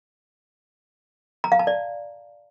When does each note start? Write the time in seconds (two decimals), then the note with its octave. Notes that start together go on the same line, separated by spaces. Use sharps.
1.44 A#5
1.52 F5
1.59 A5
1.67 D5